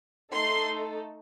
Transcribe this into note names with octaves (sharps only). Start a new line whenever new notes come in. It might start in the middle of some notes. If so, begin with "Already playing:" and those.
A3 D#4 A4 C6